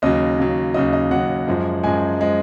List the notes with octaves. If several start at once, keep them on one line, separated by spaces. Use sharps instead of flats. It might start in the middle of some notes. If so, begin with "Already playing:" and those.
D#2 C#3 F#3 D#5
D#2 C#3 F#3
D#2 C#3 F#3 D#5
D#5
D#2 C#3 F#3 F#5
F#2 F3 G#3
F#2 F3 G#3 G#5
F3 G#3